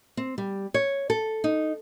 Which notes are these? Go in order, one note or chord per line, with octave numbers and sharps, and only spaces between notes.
C4
G3
C#5
A4
D#4